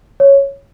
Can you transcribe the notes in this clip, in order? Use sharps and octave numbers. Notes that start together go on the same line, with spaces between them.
C#5